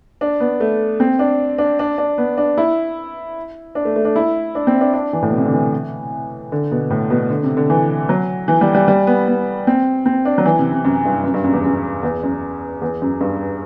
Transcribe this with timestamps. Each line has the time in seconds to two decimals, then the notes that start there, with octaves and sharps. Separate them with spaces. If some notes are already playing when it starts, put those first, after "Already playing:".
0.21 D4
0.40 B3
0.60 A3
1.00 C4
1.19 D4
1.58 D4
1.79 D4
1.98 D4
2.18 B3
2.38 D4
2.58 E4
3.75 D4
3.85 A3
3.96 A3
4.05 D4
4.16 E4
4.55 D4
4.67 C4
4.81 D4
4.93 D4
5.13 E3
5.22 A2
5.30 B2
5.37 C3
5.46 D3
5.53 E3
6.52 D3
6.71 B2
6.90 A2
7.10 B2
7.30 D3
7.43 C3
7.57 D3
7.70 E3
8.09 F#3
8.48 E3
8.61 G3
8.75 G3
8.88 G3
9.07 B3
9.28 B3
9.67 C4
10.06 C4
10.25 D4
10.38 F#3
10.45 E3
10.59 C3
10.72 C3
10.85 F#2
11.05 G2
11.24 F#2
11.34 G2
11.44 F#2
11.53 E2
11.64 F#2
12.03 E2
12.23 F#2
12.82 E2
13.02 F#2
13.21 G2